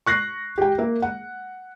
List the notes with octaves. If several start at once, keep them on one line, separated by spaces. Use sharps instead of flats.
C#6 F#6 A#6 C7
G4 G5
A#3 A#4 E5
F#5